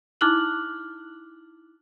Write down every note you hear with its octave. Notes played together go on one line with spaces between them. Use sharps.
D#4 E4 D6 F6 F#6 F#7